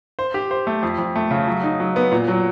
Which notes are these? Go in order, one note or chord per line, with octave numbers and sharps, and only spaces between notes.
C5
G4
C5
A3
F2
F2
A3
C#3
F#3
D#4
F#3
B3
A#2
F#3